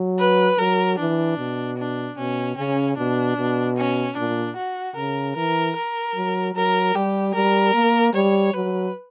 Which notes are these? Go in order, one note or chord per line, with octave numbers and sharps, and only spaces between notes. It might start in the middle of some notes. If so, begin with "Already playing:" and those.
Already playing: F#3
B4
F#3 A#4
E3 D4
B2
D4
B2 C#4
C#3 C#4
B2 D4
B2
C#4
A#2 D4
F#4
C#3 A#4
E3 A#4
A#4
F#3
F#3 A#4
G3 G4
G3 A#4
A#3
G3 C#5
F#3 B4